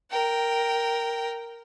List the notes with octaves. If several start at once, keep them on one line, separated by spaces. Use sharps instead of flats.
A#4 G5